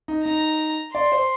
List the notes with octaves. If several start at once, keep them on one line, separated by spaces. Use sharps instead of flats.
D#4
D#4 A#5
D5 C6
C5